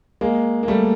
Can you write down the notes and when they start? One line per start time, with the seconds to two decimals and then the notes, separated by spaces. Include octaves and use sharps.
0.21 G#3 A#3
0.63 A#3
0.68 G3 A3